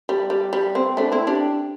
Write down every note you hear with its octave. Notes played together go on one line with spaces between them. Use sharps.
G3
G3
G3
C4
A3 D4
C4 E4
D4 G4